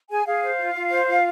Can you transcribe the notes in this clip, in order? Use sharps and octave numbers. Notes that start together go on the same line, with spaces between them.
G#4 G#5
G#4 F5
C5
F4
F4
C5
F4